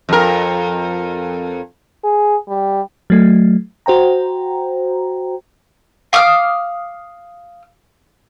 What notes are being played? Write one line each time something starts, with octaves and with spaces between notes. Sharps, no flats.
F2 A#4
G#4
G3
F#3 A3
F#4 C5 G5 A#5
F5 D6 D#6 F6